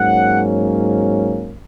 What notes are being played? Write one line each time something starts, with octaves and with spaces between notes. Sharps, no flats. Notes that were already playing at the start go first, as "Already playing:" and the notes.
Already playing: G#2 F#3 A#3 C#4 F#5